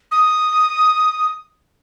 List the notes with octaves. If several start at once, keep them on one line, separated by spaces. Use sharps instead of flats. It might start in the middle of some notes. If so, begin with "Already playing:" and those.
D#6